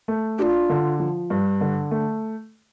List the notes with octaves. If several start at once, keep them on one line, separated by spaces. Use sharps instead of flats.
A3
D4 F4 G4
D3
F3
G2
D3
A3